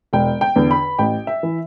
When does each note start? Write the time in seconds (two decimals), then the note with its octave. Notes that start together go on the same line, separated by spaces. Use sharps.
0.13 E1 G5
0.41 G5
0.56 E2 D3
0.71 B5
0.99 A1 G5
1.27 E5
1.43 E3